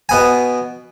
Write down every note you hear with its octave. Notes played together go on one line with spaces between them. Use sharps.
B2 B3 G#5